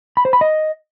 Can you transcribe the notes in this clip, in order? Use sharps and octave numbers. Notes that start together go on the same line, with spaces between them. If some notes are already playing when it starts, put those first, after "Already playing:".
B5
C5
B5
D#5